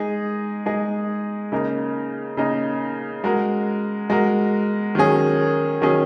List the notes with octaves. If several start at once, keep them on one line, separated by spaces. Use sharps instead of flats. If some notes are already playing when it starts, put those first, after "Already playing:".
Already playing: G#3 D#4 G#4
G#3 D#4 G#4
C#3 A#3 D#4 A#4
C#3 A#3 D#4 A#4
G#3 F#4 A#4
G#3 F#4 A#4
D#3 F#3 C#4 G#4
D#3 F#3 C#4 G#4